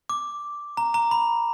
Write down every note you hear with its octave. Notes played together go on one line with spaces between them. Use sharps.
D6
A#5
A#5
B5